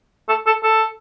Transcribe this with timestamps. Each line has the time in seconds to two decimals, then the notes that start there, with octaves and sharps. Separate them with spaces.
0.29 A4
0.46 A4
0.63 A4